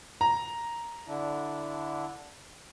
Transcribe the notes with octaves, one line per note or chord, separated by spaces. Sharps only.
A#5
D3 D4 E4